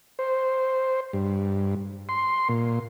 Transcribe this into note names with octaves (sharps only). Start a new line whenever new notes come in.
C5
G2
C6
A#2